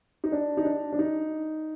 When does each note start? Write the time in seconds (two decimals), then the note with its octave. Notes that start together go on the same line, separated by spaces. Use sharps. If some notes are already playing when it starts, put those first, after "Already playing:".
0.24 D#4
0.32 D4
0.57 D#4
0.65 D4
0.93 D4
0.99 D#4